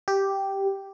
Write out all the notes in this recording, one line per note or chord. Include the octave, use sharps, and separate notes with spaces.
G4